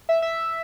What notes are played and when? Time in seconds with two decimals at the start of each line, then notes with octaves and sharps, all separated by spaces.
0.09 E5
0.22 E5